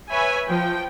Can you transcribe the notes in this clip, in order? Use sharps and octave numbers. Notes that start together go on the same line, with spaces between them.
B4 C#5 E5 G#5 B5
F3 G5